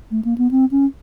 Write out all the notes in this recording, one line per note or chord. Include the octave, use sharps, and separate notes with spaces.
A3
A#3
B3
C4
C#4